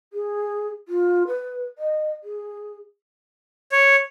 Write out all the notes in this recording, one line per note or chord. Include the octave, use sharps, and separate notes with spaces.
G#4
F4
B4
D#5
G#4
C#5